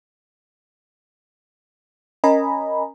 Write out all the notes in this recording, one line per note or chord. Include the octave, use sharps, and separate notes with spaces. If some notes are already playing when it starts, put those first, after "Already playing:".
C#4 A#4 D#5 G#5 A#5 B5